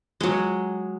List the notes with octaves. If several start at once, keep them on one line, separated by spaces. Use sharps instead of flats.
F#3 G#3